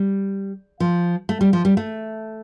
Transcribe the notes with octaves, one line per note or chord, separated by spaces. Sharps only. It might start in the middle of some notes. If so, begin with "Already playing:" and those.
Already playing: G3
F3
A3
G3
F3
G3
A3